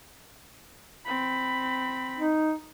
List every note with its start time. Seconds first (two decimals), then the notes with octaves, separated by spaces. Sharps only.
1.05 C4 B5
2.19 D#4